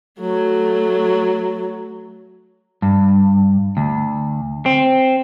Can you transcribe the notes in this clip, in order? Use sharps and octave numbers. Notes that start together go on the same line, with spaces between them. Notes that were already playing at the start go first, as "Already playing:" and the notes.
F#3 A3
G2
D2
C4